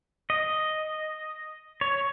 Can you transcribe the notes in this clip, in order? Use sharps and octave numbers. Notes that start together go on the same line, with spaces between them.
D#5
C#5